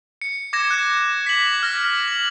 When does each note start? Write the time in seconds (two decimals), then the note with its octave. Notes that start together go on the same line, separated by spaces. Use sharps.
0.21 C#7
0.53 D6 G#6 A#6 E7
0.71 F#6
1.26 B6 F#7
1.63 F6 A#6
2.08 F#7